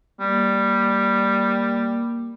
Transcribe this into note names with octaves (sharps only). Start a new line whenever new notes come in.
G3 A#3